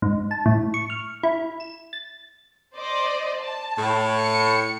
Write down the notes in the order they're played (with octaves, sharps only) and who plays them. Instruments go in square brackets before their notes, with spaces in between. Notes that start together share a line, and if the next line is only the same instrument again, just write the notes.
[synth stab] G#2
A5
A2
C#6
F6
E4
E7
A6
[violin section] C5 D5 D#5
A5
[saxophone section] A2
[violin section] C#7